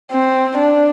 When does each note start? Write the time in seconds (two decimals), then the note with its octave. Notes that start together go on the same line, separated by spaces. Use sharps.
0.11 C4
0.58 D4